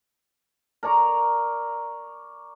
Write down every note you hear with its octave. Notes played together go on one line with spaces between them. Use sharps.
A#4 D5 A#5 C#6